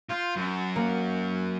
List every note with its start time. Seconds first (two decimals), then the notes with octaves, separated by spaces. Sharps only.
0.10 F4 G6
0.36 F#2
0.76 A#3